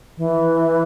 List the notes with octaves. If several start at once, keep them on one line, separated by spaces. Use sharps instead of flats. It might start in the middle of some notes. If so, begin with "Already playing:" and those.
E3